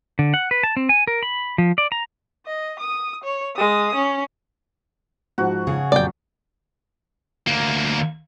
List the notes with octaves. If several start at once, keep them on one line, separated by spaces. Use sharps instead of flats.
D3
F#5
B4
A5
C4
G#5
A#4
B5
F3
D5
A#5
D#5
D#6
C#5
G#3 D#6
C#4
G#2 F3 F#4
C#3 G#4
F1 A#1 F#2 D5 G5
D2 A#3